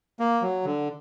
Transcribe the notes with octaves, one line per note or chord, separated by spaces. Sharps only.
A#3
F#3
D3